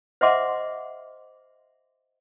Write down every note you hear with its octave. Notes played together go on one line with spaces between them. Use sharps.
C5 D#5 E5 F#5 C6 D6